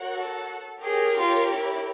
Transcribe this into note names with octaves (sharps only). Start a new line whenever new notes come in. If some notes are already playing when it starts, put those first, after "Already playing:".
Already playing: F#4 A#4 C#5 F#5
A4
G4 G#4 A#4 C#5
F4
E4